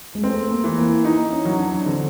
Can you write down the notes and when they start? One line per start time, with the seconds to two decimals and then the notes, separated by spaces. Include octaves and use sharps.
0.15 G#3
0.24 A3 C4
0.51 A#3
0.64 E3
0.78 A#3
1.05 D#4
1.32 C#4
1.45 F#3
1.58 D4
1.86 D3 C4